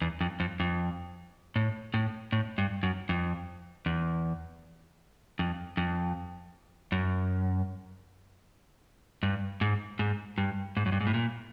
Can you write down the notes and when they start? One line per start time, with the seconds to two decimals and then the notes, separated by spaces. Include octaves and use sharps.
0.02 E2
0.21 F2
0.40 F2
0.60 F2
1.56 A2
1.94 A2
2.32 A2
2.58 G2
2.83 F#2
3.09 F2
3.86 E2
5.39 F2
5.77 F2
6.92 F#2
9.23 G2
9.61 G#2
9.99 G#2
10.38 G2
10.77 G#2
10.86 F#2
10.92 G2
11.00 G#2
11.07 A2
11.14 A#2